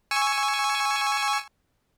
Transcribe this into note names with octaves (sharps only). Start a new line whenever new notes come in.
G#5 C#6 E6